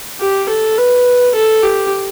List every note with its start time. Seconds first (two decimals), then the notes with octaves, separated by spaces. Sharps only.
0.21 G4
0.49 A4
0.78 B4
1.35 A4
1.63 G4